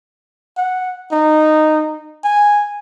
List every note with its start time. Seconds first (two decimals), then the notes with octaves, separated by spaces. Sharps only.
0.57 F#5
1.12 D#4
2.24 G#5